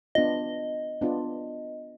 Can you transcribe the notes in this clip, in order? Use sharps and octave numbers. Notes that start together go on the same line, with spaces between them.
B3 D4 F4 D#5
B3 D4 F4